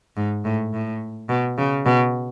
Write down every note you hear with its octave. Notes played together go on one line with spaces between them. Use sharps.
G#2
A2
A2
B2
C#3
B2